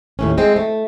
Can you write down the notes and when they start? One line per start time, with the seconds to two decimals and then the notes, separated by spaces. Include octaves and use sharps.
0.19 D#2 A2 C#4
0.38 G#3 C4
0.56 A3